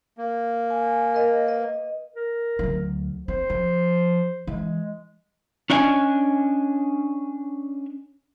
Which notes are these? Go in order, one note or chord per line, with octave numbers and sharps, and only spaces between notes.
A#3
G#5
A#4 D#5
B4 D#5
A#4
D2 F#3
C4 C5
F3
E3 G#3
C#4 D4 E4 C#5 D#5 G#5